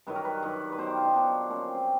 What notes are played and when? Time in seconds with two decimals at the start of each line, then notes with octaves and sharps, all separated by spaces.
0.07 G2 D#3 F#3 B4
0.15 A#4
0.25 B4
0.43 G2 D#3 F#3
0.72 B4
0.78 B2 F#3 C5
0.87 G4
0.97 F4
1.05 D#4
1.14 B2 F#3 D4
1.50 A#2 F3 C#4
1.63 C4
1.74 C4